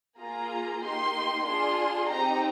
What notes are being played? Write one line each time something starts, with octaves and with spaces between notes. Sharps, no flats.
A#3 F4 G#4 A#5
A#3 D#4 G4 C6
D4 F4 G#4 C6
C4 D#4 G4 A#5